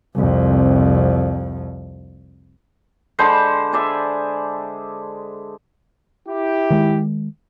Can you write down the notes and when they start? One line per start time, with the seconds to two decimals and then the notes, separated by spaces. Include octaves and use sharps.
0.15 C2 F2
3.19 D3 G#3 C5 B5
3.73 G#4 D5 E5
6.28 E4 G4
6.70 D#3 G#3